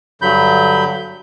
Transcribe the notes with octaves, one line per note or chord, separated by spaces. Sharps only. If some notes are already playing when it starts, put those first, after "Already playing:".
G2 D3 F#3 B5 G6